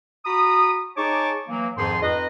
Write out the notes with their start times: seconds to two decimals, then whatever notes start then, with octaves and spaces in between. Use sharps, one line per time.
0.25 F#4 A#5 B5 D#6
0.96 D#4 G#4 C#5 A5 C#6 D6
1.48 E3 F#3 A#3
1.76 F2 G#2 D#3 F3 G#4 C6
2.01 F2 D#4 F4 B4 D#5